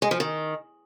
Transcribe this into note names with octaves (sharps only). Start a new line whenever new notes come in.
G#3
F3
D#3